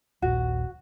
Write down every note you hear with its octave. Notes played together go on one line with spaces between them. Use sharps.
D#1 A#1 F#4